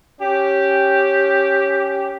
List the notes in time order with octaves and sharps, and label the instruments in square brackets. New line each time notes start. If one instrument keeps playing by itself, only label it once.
[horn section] C#4 G4